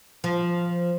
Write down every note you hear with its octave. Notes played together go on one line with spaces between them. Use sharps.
F3